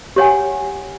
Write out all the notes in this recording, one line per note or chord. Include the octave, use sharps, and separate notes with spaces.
G4 C#5 F#5 G#5